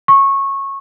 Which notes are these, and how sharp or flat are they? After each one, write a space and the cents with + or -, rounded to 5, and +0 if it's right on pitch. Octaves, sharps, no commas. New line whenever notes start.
C#6 -20